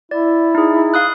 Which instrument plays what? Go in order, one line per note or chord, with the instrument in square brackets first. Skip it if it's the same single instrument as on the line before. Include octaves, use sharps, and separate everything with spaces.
[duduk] E4 [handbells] D5
[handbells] D#4 G#4
F5 D#6 F#6